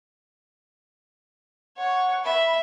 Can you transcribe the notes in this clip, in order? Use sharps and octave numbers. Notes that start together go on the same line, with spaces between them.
C#5 F#5
E5 B5